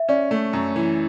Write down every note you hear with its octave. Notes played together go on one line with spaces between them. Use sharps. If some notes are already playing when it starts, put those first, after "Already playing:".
Already playing: E5
C#4 D5
A3
F#2
E3